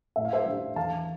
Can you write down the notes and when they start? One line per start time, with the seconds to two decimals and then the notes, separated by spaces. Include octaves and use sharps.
0.16 A2 E5
0.25 F5
0.33 C5 E5
0.46 G3 D4
0.76 E2 F5 A5